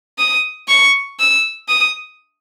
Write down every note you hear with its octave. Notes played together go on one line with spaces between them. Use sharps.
D#6
C#6
E6
D#6